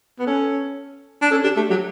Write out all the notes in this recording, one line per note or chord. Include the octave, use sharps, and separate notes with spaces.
B3
C#4 A4
D4
C#4 A4
D4 G4
A3 G4
F#3 G4